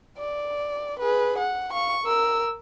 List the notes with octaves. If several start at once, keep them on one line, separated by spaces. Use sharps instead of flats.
D5
G#4 B4
F#5
F5 C#6
A#4 E6